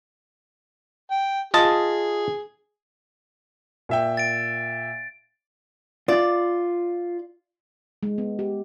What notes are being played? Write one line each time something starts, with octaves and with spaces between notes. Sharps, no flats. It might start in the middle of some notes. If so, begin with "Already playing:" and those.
G5
F4 G#4 D#5 A5
A#2 E5 G5
A6 D7
F4 D5
G#3
B3
G4